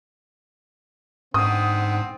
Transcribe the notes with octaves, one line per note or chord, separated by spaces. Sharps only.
G#2 D3 B3 C4 D#6